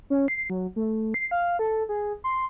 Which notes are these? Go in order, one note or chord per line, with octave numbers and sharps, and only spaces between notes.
C#4
C7
F#3
A3
C7
F5
A4
G#4
C6